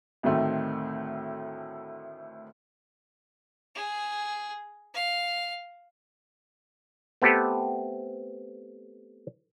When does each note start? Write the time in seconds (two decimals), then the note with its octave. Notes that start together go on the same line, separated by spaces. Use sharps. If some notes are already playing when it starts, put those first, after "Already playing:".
0.23 D2 A2 D#3 A3 C4
3.75 G#4
4.94 F5
7.22 A3 B3 C4 G4 A4 B4